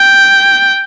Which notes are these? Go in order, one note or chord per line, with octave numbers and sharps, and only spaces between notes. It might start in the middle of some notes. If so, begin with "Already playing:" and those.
Already playing: G5